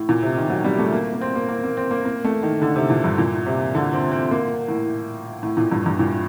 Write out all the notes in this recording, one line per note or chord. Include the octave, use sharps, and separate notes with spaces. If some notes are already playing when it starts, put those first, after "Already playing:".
Already playing: A2
A#2
C3
D#3
F#3
G3
A3
A#3
A#3
C4
A#3
A#3
A#3
C4
A#3
A#3
A3
D#3
D3
C3
A#2
G2
A#2
C3
D3
C4
C4
A#3
A2
A2
A#2
G2
G2
A#2